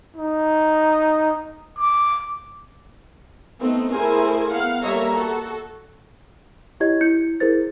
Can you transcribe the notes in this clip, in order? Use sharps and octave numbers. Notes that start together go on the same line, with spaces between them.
D#4
D6
A3 B3 C4 D#4
A3 E4 G#4 A#4 C5 G#5
B3 F5 F#5
G3 A#3 A4 C#5 E5 A#5
F#4 A4
E4 G4 C#5 D#5 G#6
E4 G6 C#7
E4 G#4 A#4 C5 A6